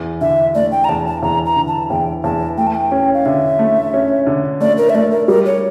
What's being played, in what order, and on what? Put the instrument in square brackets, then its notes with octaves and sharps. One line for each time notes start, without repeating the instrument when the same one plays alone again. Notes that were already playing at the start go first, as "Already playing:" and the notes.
Already playing: [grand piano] E2
[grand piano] D3 [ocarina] E5
[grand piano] A3 [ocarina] D5
[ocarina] G5
A#5
[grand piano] E2 [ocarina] A5
[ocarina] A5
[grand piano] E2 [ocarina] A#5
[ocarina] A#5
[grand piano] D3
[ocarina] A5
[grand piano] E2 [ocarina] G5
[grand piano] E2 [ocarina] A5
[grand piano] A3 [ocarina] G5
[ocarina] A5
G5
[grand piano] C#4
[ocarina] F5
[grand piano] D3 [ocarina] E5
[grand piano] A3
C#4
D3
[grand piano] A3 [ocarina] D5
[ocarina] A#4
E5
[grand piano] A3 [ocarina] D5
[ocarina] A#4
[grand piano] G3 [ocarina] A#4
[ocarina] C#5